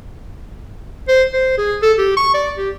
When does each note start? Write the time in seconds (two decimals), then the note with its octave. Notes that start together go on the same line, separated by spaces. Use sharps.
1.08 C5
1.34 C5
1.58 G#4
1.82 A4
1.98 G4
2.17 C#6
2.34 D5
2.57 G4